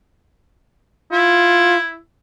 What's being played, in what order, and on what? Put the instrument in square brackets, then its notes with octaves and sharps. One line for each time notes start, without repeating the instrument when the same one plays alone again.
[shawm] E4 [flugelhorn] F4